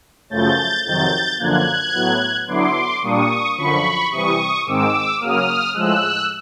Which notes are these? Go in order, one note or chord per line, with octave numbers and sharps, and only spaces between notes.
F#2 C#3 F3 A3 G6 A6
F2 C3 D#3 F#3 G6 A6
F#2 D3 F3 A#3 F#6 G#6
A2 F#3 B3
D3 F#3 B3 E4 C6 D6
A#2 G3 A#3 D4 C#6 D#6
F#2 D3 F3 B5 C#6
C3 E3 G3 C#6 D#6
G#2 D#3 G#3 C4 D6 E6
C#3 F#3 A#3 D#6 F6
A2 F3 G#3 E6 F#6